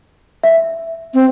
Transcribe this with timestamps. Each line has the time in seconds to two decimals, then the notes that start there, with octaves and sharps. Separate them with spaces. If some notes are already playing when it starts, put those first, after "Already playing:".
0.43 E5
1.14 C4